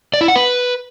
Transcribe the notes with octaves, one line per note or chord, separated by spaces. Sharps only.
D5
E4
F#5
B4